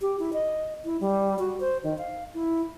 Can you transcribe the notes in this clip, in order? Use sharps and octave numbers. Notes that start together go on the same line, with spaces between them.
G4
E4
D#5
E4
G3
F#4
C5
D#3
F5
E4